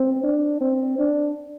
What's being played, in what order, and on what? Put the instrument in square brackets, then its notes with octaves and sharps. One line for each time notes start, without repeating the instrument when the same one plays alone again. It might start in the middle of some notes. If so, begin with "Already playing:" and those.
Already playing: [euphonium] C4
D4
C4
D4